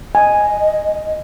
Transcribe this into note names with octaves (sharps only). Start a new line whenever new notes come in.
D#5 G#5